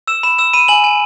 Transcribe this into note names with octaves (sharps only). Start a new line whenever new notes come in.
E6 E7
B5 E7
E6 E7
B5 D#7
G#5 F#7
G#5